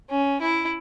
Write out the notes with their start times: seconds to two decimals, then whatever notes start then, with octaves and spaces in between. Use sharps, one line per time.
0.11 C#4
0.41 E4